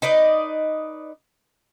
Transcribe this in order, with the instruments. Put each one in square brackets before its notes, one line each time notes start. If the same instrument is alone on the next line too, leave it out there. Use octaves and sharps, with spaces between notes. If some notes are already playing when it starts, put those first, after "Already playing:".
[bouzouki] D#4 B4 D5 D#5